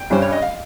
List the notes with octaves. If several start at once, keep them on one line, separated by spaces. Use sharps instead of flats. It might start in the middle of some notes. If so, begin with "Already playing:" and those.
Already playing: G5
G2 G3 C#4 C5
C#5
D#5
F5